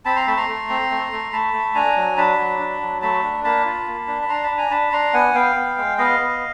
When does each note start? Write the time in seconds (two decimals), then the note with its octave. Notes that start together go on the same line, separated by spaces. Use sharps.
0.05 C4 A5 B5
0.16 A#5 C6
0.27 A3 A5 B5
0.37 A#5 C6
0.49 A3
0.69 C4
0.91 A3
1.12 A3
1.33 A3 A5 B5
1.54 A3
1.75 D4 G#5 A#5
1.96 F#3
2.17 D4 A5 B5
2.38 F#3
2.59 D4
2.81 F#3
3.02 A3 A5 B5
3.23 D4
3.44 A#3 A5 B5
3.65 F4
3.87 A#3
4.07 D4
4.22 B5
4.29 D4 A#5 C6
4.43 A5 B5
4.51 D4
4.58 G#5 A#5
4.71 D4 A5 B5
4.92 D4 A#5 C6
5.14 B3 F#5 G#5
5.34 B3 F5 G5
5.56 B3
5.78 G#3
5.98 B3 D#5 F5
6.20 B3